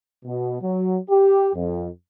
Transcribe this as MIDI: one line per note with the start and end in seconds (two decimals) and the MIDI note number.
0.25 0.58 47
0.62 0.98 54
1.10 1.50 67
1.54 1.88 41